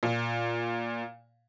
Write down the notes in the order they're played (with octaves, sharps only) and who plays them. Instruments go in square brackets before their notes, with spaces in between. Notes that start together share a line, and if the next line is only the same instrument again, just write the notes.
[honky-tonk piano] A#2